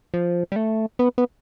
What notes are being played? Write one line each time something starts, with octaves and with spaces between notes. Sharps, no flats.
F3
G3
A3
B3
B3